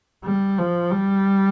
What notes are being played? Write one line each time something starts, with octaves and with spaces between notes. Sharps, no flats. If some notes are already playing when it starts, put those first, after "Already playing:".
G3
F3
G3